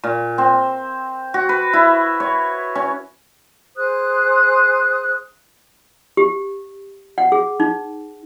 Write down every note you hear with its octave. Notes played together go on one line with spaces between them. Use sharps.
A#2
C4
F#4
B4
E4
C#5
C#4
G#4 C5 D#6 F#6
G4
F#5
G#4
D#4